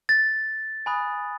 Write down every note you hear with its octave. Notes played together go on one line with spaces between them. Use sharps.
A6
G#5 B5 D#6 F#6